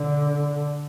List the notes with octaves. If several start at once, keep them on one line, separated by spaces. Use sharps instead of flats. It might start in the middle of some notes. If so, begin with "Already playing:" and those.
Already playing: D3